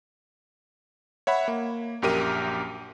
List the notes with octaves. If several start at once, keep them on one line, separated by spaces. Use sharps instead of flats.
C#5 E5 F#5 B5
A#3
A#1 F#2 G4 A#4 D#7